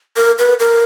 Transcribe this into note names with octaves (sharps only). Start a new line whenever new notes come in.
A#4
B4
A#4